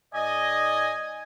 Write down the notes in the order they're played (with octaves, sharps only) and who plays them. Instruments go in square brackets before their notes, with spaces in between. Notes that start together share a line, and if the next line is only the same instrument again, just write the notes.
[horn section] G#2 D5 D#5 [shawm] G#5